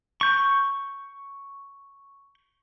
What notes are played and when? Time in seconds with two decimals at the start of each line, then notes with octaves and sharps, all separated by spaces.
0.21 C#6 G6